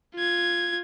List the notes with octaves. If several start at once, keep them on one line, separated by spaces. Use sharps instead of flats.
F4 G#6